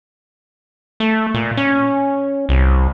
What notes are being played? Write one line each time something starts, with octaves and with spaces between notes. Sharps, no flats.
A3
A#2
C#4
C2